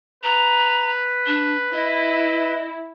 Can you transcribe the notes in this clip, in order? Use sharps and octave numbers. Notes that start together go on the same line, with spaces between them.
B4 A#5
D4
E4 D#5